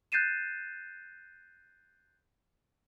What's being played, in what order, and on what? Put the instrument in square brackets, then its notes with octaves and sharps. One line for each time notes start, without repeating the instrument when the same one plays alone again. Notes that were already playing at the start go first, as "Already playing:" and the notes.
[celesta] F#6 G6 A6 C7 D#7 E7